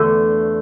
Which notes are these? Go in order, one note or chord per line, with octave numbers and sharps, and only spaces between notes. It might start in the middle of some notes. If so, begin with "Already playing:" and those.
Already playing: E2 D3 A3